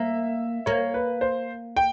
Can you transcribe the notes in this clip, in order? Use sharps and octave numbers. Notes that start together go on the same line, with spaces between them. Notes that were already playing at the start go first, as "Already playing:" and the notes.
Already playing: A#3 E5
A#3 C#5
B4
C5
G5